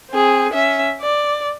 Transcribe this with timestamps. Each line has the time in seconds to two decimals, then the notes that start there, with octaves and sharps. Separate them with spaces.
0.11 C4 G#4
0.52 C#4 E5
1.01 D5